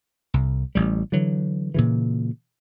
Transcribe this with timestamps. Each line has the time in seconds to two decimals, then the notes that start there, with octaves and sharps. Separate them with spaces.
0.34 C2
0.75 A1 G3
1.12 D3 E3 F#3
1.74 A#2 C#3 E3